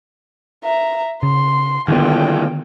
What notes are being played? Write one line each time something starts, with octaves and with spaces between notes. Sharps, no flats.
E5 A#5
C#3 C6
C2 A#2 D3 D#3 B3 A4 G5